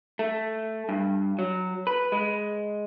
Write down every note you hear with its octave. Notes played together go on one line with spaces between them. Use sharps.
A3
G2
F#3
B4
G#3